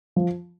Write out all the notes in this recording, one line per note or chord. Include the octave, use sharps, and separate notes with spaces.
F3